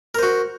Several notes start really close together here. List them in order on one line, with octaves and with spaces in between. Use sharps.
A#4 C5 F#4